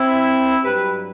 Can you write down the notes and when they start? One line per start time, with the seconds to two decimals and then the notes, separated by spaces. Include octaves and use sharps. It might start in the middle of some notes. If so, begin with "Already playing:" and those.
Already playing: C4 E4
0.64 G2 F#3 G4 B4